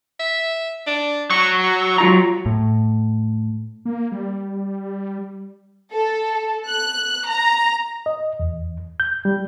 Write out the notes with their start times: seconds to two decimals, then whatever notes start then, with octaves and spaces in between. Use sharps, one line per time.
0.19 E5
0.87 D4
1.30 F#3 C#6
1.64 C#6
1.98 F#3 F4 A#5
2.46 A2
3.85 A#3
4.12 G3
5.93 A4
6.67 F#6
7.27 A#5
8.06 D#5
8.40 E2
9.00 G6
9.25 G3